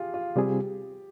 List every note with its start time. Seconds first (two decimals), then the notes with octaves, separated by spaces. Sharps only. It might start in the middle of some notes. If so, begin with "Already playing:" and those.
Already playing: F4 G4 G#4
0.14 F4
0.36 C3 G3 C4 F4 G4 G#4